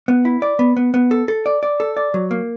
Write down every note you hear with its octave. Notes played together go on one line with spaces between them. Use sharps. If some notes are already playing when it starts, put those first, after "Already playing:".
B3
E4
D5
B3
B3
B3
A4
A4
D5
D5
A4
D5
F#3
A#3